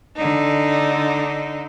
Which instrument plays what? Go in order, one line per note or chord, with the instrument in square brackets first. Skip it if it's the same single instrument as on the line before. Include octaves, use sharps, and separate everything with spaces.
[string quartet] D3 D#4